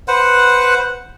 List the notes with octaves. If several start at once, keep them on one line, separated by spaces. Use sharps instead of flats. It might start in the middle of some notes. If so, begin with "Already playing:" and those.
B4 C5 F#5